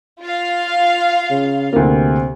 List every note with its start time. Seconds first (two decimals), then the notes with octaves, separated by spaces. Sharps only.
0.21 F4 F5
1.31 C#3
1.73 D2 C3 A#3